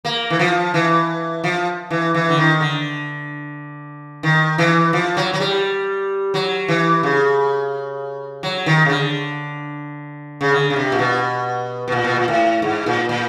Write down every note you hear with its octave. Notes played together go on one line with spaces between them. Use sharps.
A#3
E3
F3
E3
F3
E3
E3
D3
D#3
D3
D#3
E3
F3
F#3
F#3
G3
F#3
E3
C#3
F#3
D#3
C#3
D3
C#3
D3
C#3
C3
A#2
B2
B2
A#2
B2
A#2
A2
G#2
A#2
A#2